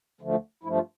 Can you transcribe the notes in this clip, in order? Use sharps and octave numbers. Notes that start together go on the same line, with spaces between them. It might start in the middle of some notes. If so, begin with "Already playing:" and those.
D2 D3 F3 A3
G2 F3 A3 E4
F4